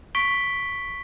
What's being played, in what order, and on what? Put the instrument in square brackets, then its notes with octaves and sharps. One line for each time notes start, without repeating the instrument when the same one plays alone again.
[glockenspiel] C#6 B6 D7 G7